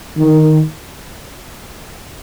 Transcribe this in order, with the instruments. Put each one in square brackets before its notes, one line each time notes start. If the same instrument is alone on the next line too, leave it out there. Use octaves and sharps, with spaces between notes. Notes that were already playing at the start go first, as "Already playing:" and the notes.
[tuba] D#3